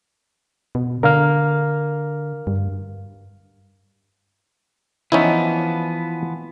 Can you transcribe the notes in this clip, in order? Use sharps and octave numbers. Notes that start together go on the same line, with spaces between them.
B2
D3 A#4 F5 F6
G2
E3 F3 B3 C#4 D#4 E4